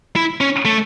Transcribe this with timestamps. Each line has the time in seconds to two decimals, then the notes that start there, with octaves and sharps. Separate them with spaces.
0.16 E4
0.41 C#4
0.65 A3